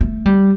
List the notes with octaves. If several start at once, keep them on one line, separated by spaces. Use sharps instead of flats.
A3
G3